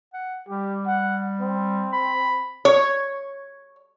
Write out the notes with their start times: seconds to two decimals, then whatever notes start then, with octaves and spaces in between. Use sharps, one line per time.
0.13 F#5
0.48 G3 G4
0.87 F#5
1.41 C4
1.93 B5
2.65 C#5